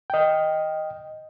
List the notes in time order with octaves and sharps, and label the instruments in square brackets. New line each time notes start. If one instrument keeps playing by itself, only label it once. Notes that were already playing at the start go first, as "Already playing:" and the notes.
[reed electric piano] D#5 G5